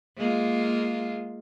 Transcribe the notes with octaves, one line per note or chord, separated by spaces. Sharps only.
G#3 A#3 F4